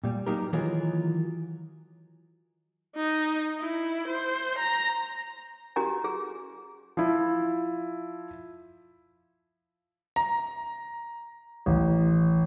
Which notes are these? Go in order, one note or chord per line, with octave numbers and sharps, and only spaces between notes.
A#2 G3
F#3 A#3 D#4 G4 A#4
D#3 E3 F#3 F4 G#4 A#4
D#4
E4
C5
A#5
C#4 F#4 G4 A#4 G#5 A#5
G#4
F3 E4
A#5
A1